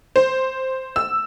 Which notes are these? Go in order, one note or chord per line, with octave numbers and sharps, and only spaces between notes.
C5
E6